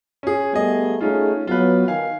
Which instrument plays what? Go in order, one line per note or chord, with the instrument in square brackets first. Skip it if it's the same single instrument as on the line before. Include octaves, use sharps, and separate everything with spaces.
[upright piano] C#4 G#4
[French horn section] G3 A3 B3 [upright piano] G#4 D#5
[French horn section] A3 D#4 G#4 [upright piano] C#4 F4
[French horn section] F#3 B3 [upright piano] F4 B4
[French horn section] D#3 [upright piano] F5 G#5